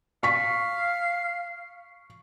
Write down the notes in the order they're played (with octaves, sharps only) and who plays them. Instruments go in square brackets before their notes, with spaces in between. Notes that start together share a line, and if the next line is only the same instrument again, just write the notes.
[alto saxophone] F5 [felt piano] C#6 B6